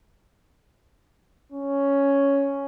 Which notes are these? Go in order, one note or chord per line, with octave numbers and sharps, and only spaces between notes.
C#4